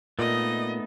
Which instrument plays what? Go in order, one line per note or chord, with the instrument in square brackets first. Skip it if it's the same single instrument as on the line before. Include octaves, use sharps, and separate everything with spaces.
[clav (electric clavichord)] A#2 [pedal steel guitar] A3 B3 D#4 [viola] D#5